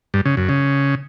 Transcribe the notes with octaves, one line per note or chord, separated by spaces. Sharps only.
G2
C#3
F#2
C#3